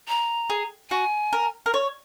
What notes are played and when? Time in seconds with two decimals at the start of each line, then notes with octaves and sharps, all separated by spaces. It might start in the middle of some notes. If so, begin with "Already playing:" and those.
0.08 A#5
0.50 G#4
0.91 F#4 G#5
1.33 A#4
1.66 A#4
1.74 C#5